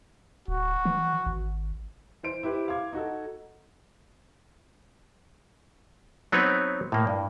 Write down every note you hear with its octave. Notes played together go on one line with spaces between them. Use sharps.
D1 F#4
E3
G#1
E3 C5 D7
E4 G4 B4 C5
F5 C6 D6 G#6
D#4 F#4 A4
F#3 B3 C4 D#4 B4 C#5
A2 A#3
G2